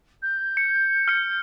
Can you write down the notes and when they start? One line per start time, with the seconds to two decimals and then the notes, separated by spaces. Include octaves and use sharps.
0.22 G6
0.57 C#7
1.08 F6 C#7